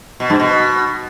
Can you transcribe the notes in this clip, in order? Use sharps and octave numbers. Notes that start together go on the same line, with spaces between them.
B2
G2
B2